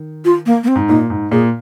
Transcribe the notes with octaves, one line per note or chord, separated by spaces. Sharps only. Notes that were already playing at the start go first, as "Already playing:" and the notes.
Already playing: D#3
F4
A#3
A#3
C4
G#2
A#2 D#4
G#2
A#2 G#4